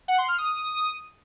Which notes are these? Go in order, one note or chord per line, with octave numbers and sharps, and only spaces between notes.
F#5
C6
F6
D#6